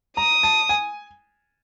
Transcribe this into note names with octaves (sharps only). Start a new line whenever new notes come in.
A#5 D#6
A5
G#5